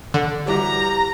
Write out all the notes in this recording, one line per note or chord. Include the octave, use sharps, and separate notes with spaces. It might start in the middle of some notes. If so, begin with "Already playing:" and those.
D3
E3 G3 F#4 G4 A#5